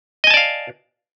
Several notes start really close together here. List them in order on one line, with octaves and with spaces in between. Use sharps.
D#5 G#5 A5 D5 F5